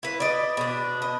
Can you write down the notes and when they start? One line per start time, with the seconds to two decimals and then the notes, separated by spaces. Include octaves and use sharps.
0.03 E4 B4
0.20 D5 D#5
0.57 B2 D4
1.02 D#5